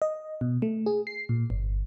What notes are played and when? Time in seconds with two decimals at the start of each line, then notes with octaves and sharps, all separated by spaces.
0.02 D#5
0.41 B2
0.62 A3
0.86 G#4
1.07 C7
1.29 A#2
1.50 G1